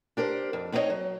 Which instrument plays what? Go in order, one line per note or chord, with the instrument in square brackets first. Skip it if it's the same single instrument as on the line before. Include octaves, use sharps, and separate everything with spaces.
[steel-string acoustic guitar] D4 G4 A#4 C5
F2
B3 C4 D#4 E4 C#5 D#5
F#3